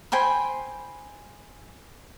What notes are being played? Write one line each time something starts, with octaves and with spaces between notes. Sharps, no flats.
C5 G5 G#5 B5